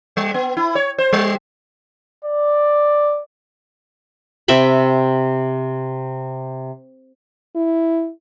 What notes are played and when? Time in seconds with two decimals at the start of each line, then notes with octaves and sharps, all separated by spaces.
0.17 G3
0.34 B3
0.57 E4
0.75 C#5
0.98 C5
1.13 G3
2.25 D5
4.48 C3 E5 G5 B5
7.56 E4